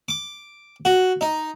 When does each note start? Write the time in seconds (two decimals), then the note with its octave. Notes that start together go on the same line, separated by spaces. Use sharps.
0.08 D6
0.85 F#4
1.21 D#4